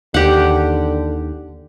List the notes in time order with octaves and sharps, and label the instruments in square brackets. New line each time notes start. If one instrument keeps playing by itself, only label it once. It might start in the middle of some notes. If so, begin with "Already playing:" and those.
[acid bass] D#2 [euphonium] D3 [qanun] G4 F#5